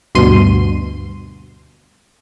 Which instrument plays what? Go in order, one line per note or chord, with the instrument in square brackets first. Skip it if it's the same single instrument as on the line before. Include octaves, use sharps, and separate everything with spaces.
[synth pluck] D2 G2 B2 C6 D#7